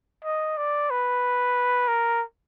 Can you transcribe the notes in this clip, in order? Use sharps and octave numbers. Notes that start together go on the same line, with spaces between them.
D#5
D5
B4
A#4